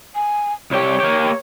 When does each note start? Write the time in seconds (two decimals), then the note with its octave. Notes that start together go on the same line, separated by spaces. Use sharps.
0.15 G#5
0.71 C2 G4 C#5
1.00 A#3 G4